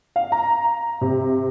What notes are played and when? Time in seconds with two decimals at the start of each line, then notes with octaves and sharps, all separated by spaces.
0.16 F5
0.32 A#5
1.01 C3